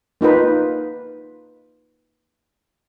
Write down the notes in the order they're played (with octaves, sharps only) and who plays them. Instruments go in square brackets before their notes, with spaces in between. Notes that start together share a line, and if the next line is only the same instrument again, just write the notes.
[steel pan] A#3 D#4 F4 B4